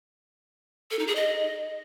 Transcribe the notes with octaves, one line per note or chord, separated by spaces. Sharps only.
A4
D#4
G#4
D#5